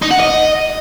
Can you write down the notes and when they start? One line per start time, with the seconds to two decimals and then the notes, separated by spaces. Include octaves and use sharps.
0.02 D#4
0.11 F#5
0.20 D#5